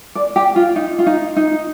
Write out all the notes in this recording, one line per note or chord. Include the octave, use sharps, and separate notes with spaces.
D5
G4
F4
D#4
F4
D#4
D#4